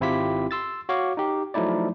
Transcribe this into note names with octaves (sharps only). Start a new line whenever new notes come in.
G#1 C4 E4 F4 G4 B6
C6 E6 A6
F#4 C#5 F5 D6
D#4 G4
F3 F#3 A3 D#4 E4 D5